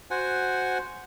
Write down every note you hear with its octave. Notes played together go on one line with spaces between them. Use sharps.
F#4 C5 F#5 G#5